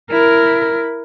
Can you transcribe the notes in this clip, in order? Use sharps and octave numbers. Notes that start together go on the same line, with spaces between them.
E4 A#4